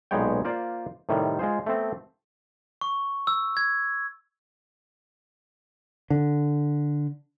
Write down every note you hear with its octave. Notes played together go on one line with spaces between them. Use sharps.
B1 A#2 G#3 B3 C#5 G5
A#3 F4 C5 D5
A2 C3 D#3 G3 C#5
G#3 F4 G#4 C5
A3 B3 C4 A5
C#6
E6
G#6
D3